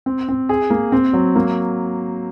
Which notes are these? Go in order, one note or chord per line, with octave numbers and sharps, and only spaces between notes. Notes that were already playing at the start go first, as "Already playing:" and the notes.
C4
C4
G#4
A#3
C4
F#3
A#3